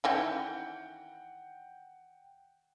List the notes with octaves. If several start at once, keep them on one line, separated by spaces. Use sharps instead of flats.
D#3 E3 C#4 F#5 G5 G6